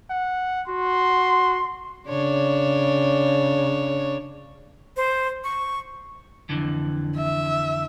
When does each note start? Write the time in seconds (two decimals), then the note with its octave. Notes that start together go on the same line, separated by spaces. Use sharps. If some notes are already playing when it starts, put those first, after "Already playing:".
0.10 F#5
0.68 F#4 C6
2.08 C#3 D4 C#5
4.97 C5
5.44 C#6
6.49 F2 D3 E3
7.17 E5